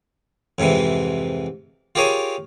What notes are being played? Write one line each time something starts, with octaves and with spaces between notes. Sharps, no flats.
F2 G#2 C3 E3
F4 G4 G#4 A#4 C#5 G#5